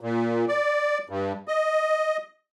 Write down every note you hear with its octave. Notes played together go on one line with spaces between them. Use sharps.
A#2
D5
G2
D#5